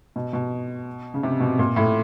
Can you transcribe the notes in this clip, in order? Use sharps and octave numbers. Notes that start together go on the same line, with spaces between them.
B2
B2
C#3
C3
B2
A#2
A2